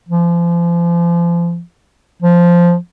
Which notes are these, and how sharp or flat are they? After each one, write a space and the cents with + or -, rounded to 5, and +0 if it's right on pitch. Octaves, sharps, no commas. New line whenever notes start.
F3 -35
F3 -5